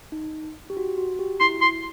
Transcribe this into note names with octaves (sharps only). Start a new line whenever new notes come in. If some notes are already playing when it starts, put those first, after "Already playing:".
D#4
G4
F#4
F#4
G4
E4 C6
C6